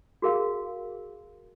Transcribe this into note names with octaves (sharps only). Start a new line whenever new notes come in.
F#4 G#4 A#4 F5